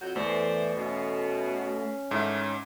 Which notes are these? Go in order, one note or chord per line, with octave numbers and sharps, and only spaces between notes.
F2 F#3 G6
E2 E3 A3 C5 D5
B2 C#4
G#2 D#3 E3 A3 E4 E5